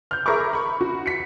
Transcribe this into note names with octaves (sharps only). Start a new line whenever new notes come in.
F6 G6
G#4 A#4 E5 B5 C#6 D6
B5 C#6
F#4
B6 C#7